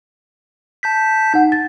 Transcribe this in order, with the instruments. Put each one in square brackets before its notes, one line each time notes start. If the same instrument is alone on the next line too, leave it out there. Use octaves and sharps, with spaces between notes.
[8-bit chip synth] A5 G6 B6
[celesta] D#4 F#5
A6